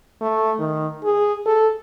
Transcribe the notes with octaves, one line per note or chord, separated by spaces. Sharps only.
A3
D#3
G#4
A4